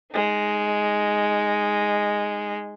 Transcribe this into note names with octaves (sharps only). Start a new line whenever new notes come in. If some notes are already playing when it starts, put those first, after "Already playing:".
G#3 D#4